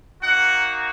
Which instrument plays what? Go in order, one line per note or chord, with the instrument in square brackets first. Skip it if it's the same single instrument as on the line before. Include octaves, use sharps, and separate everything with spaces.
[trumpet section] A#3 D#4 F#4 F#5